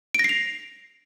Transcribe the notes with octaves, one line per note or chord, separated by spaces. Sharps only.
A#6 C7 D7 F7